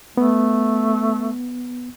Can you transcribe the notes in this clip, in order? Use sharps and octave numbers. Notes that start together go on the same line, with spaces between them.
A3 B3